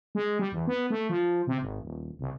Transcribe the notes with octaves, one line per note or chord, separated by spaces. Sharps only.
G#3
G3
E2
B3
A3
F3
C3
G#1
D#1
C2